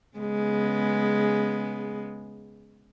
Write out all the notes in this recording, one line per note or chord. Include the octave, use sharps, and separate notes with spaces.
C#3 G#3 B3